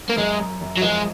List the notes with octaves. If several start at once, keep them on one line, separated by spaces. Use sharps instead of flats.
A#3
F#2 G#3
F#2
F#2
F#3
F3 G#3